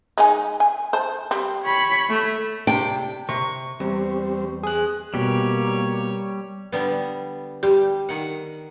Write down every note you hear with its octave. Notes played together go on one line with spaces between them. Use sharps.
G#3 D#4 G#5
G#5
C5 A5
G3 C4
C#5 B5
A3
C3 D4 G5
C3 C6 C#6
E2 G3 C4
G#4 F#6
B2 G3 A#3 G4 C#5
D3 G3 B3
G3 G4
D#3 F#5